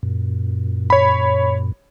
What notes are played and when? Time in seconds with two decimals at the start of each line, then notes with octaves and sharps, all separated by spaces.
0.03 F#2 A#2
0.90 C#5 B5